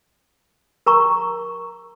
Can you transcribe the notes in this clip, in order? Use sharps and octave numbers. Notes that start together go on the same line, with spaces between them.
A#4 A#5 C#6